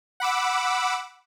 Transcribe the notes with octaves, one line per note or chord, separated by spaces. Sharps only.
F#5 B5 D6 E6